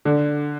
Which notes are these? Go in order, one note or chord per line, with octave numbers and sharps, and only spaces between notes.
D3